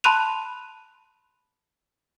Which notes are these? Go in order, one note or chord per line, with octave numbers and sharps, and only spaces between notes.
A5 B5 C6 F#6 D#7 F7